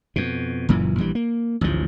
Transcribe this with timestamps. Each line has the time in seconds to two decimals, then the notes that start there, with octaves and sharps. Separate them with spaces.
0.16 F2 B2
0.69 F#1 F#2 A#2 E3
0.98 A#1 E3 G3
1.15 A#3
1.61 A1 D2 G#2 F3